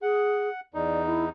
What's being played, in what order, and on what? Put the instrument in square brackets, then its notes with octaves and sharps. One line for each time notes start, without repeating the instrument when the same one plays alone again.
[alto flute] G#4 [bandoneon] F#5
[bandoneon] E2 D#4 [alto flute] D5
[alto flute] E4